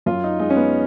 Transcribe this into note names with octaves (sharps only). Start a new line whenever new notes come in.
F#2 F4
D#4
G#3 D#4
C#4
B3